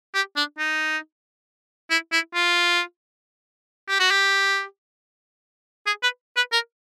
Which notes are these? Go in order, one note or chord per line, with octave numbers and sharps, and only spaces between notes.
G4
D4
D#4
E4
E4
F4
G4
F#4
G4
G#4
B4
B4
A#4